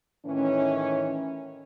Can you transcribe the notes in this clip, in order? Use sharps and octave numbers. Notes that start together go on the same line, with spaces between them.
A2 D#3 E3 C#4